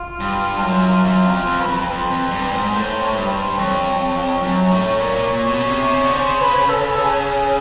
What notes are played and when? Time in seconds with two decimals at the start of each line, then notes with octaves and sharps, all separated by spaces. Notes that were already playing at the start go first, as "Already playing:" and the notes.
Already playing: F4
0.20 G2
0.62 F#2
1.04 F#2 F4
1.26 F2
1.33 F4
1.47 F2
1.61 B4
1.68 F2
1.90 F2 C5
2.10 F2
2.31 G2
2.53 G#2
2.73 A2 C5
3.02 C#5
3.16 G2
3.25 B4
3.30 C5
3.59 F2 C#5
4.43 F#2
4.71 A2
4.99 A#2
5.28 A#2
5.49 B2
5.60 C#3
5.70 C3
5.92 C#3
6.04 D3
6.13 C#3 C5
6.41 B4
6.69 A4
6.97 G#4